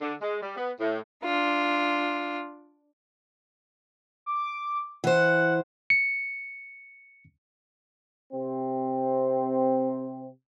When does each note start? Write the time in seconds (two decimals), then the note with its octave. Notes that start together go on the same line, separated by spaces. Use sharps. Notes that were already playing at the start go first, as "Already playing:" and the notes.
0.01 D3
0.21 G#3
0.42 G3
0.56 B3
0.80 A2
1.24 D4 F4
4.26 D6
5.04 E3 C5 F#5
5.90 C#7
8.33 C3 C4